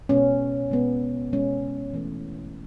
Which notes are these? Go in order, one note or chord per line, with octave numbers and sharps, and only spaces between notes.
B2 G#3 B3 C#4
B2 G#3 B3
B2 G#3 B3 C#4
E3 A3 C#4